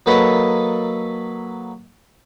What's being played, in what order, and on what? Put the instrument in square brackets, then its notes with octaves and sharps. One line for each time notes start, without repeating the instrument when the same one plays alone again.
[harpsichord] F#3 A#3 A4 B4 D#5